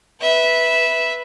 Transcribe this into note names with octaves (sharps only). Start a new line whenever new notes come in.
B4 E5